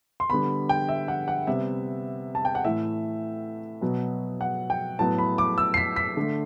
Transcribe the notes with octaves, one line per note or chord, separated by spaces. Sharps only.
C6
D3 G3 B3 B5
G5
E5
F#5
F#5
C3 G3 B3 E5
A5
G5
F#5
A2 E3 A3 E5
B2 F#3 B3
F#5
G5
A2 F#3 B3 A5
B5
D6
E6
C7
B6
B6
D3 A3